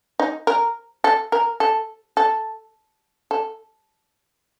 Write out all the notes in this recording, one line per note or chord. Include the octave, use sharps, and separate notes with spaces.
D#4
A#4
A4
A#4
A4
A4
A4